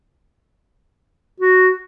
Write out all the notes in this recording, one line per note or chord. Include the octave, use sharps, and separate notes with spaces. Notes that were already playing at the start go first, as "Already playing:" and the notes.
F#4